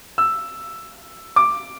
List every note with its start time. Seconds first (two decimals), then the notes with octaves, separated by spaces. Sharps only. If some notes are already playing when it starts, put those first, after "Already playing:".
0.18 E6
1.36 D6